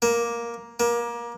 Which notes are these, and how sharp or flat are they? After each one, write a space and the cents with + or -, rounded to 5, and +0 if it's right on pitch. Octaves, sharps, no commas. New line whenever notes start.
A#3 +10
A#3 +25